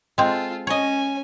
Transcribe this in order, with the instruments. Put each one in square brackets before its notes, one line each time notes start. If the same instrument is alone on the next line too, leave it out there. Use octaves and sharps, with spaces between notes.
[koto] G#3 C4 [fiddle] F4 A4
[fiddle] C#4 G#5 [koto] C#5 D#5